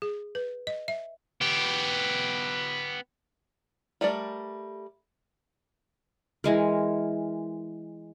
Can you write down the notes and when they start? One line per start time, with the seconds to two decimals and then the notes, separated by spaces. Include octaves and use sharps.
0.02 G#4
0.35 B4
0.67 D#5
0.88 E5
1.41 B3 G4
4.01 G3 A3 A#4 D5
6.44 E3 G#3 A#4